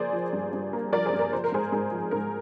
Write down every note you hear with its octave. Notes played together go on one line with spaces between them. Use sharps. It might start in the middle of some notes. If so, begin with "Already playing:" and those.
Already playing: F3 A#3 G#4 C5 D5
F3
G2
G2
A#3
F3 A#4 D5
G#4 C5
G2
A#4
F3 C5
A#4
G#2 G#4 C5
G#2 G#4
F3
G#2 A#4